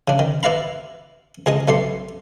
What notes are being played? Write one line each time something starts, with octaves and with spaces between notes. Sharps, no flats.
C#3 D4
D#3
E4 B4 D5 F5 A#5 B5
C#2 G#4 D#5 D#6
B1 A3 D5 C6